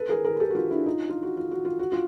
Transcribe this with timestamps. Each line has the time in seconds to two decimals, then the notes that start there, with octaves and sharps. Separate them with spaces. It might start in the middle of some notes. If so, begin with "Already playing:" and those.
Already playing: A4 B4
0.09 G#4 A#4
0.24 G#4 A#4
0.36 A#4
0.40 G4 A4
0.51 F#4
0.55 F4 G4
0.71 D4 E4
0.86 D#4 F4
1.09 F4
1.23 F#4
1.37 F4
1.51 F#4
1.65 F4
1.79 F#4
1.92 F4